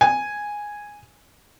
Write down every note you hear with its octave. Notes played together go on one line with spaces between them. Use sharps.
G#5